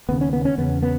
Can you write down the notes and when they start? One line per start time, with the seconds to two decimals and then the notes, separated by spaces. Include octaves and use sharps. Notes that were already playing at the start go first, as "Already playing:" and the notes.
0.09 D#2 C#3 B3
0.21 C#4
0.33 B3
0.45 C#4
0.58 E2 C#3 B3
0.83 B3